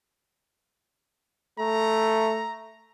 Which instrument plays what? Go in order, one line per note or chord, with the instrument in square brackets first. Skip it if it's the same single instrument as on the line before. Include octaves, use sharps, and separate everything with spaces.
[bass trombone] A3 [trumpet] A#5